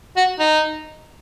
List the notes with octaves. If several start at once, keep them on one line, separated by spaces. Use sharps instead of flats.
F#4
D#4